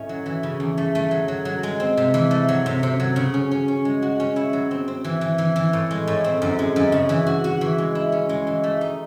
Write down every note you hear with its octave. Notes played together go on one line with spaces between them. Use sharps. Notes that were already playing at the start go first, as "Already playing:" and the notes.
Already playing: A2 A3 C#4 D#4
F#3
E3
C#3
E2
A3
A3
F#3
F#3
F#3
G#3
C4
C3
E3
A3
F#3
C3
C3
F#3
C#3
C#4
C#4
C#4
G#3
F#4
C#4
E4
F#3
C4
C4
E3
E3
E3
E3
A2
G#3
A2
C4
F#2
G#3
F#2
C#3
E3
F#4
F#4
E3
G#3
E4
C#4
G#3
E3
A3
D#4